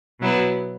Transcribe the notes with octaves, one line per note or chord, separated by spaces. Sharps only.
B2 F#3 B3 E4